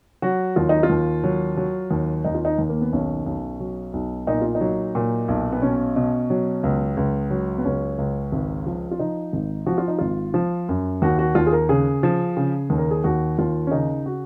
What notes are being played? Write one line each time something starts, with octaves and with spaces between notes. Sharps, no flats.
F#3 F#4
D#2 F4
D#4
F4
D#2
F#3
F#3
D#2
D#2 D#4
F4
D#4
D#2
A#3
B3
B1 C#4
B1
F#3
B1
A#2 D#4
F4
D#4
F#3
A#2
B1
B3
B2 C#4
B2
F#3
C#2
C#2
F#3
B3
C#2 C#4
C#2
G#1
F3
F4
F3 D#4
G#1
F3 F#4
F4
D#4
G#1 F4
F3
F#2
D#2 F#4
F#4
D#2 F4
G#4
A#4
C#3 G#4
F3
C#3
D#2
A#4
G#4
D#2 F#4
D#2 F4
C#4
C#3 D#4
F#4